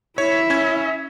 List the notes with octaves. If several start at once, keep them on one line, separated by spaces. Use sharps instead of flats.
E4 C#5 E5
C#4 G#6